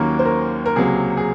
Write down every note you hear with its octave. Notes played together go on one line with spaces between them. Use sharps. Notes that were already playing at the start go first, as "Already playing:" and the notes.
Already playing: D#2 D#3 F#3 A#3 C#4 A#4
C5
A#4
A#4
C#2 C3 F#3 A#3 G#4
G#4